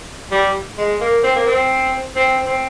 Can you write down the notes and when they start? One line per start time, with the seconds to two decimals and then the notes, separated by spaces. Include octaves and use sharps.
0.32 G3
0.78 G#3
1.01 A#3
1.24 C4
1.36 A#3
1.47 C4
2.16 C4
2.46 C4